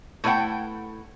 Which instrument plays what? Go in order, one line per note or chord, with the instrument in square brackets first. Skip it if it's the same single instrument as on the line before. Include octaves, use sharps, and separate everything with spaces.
[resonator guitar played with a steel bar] A3 E4 B4 D5 F#5 G5